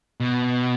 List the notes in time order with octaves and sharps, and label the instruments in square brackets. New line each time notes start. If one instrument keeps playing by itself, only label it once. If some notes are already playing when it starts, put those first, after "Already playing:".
[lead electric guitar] B2